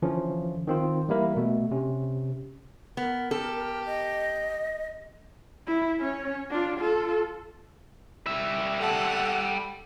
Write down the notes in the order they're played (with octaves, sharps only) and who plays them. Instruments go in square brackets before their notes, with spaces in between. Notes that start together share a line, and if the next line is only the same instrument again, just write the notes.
[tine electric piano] D3 E3 F3 C#4
D#3 C4 F4
E3 G3 A#3 E4 A#4
B2 A3
C3 C#4
[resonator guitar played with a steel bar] B3 [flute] A#4
[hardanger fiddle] G4 [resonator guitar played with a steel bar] A4
[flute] D#5
[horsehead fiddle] E4
C#4 C#5
D4 F4
F4 A4
[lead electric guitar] G3 E5
[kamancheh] A4 F#5